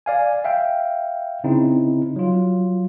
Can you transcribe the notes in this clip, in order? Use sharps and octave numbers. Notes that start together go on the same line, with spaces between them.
D5 F5 G#5
E5 F5 G5
C#3 C4 D#4 E4
F#3 F4